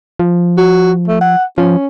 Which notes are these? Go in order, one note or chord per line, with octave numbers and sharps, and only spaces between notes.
F3
F#4
A3
F#5
F3 C#4